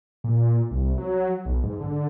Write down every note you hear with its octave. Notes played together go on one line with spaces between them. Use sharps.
A#2
C2
F#3
B1
G#2
D3